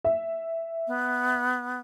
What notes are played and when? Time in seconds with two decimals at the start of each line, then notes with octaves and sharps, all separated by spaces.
0.05 E5
0.87 B3